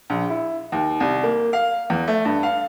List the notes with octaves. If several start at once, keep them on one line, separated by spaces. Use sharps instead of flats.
A#1
E4
D#2
C2
A#3
F5
E2
A3
G2
F5